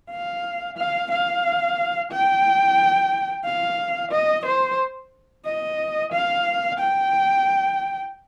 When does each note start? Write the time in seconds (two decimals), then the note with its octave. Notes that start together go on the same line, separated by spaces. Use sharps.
0.10 F5
0.77 F5
1.11 F5
2.11 G5
3.45 F5
4.11 D#5
4.45 C5
5.45 D#5
6.12 F5
6.79 G5